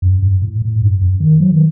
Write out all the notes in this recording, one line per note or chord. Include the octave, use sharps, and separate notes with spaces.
F#2
G2
A2
A2
G2
F#2
D#3
F#3
D#3